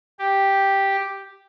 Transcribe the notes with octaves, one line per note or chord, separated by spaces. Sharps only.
G4